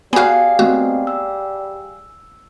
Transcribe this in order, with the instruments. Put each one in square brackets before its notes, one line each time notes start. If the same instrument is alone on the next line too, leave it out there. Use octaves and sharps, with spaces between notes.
[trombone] G3 [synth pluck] B3 F#4 [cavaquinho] G#4 F5
[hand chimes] A3 B3 C4 [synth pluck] F#4
[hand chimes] E6